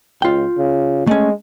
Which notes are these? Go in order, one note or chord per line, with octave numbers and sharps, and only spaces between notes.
C#2 F4 G5
C#3
G#3 A3 C#4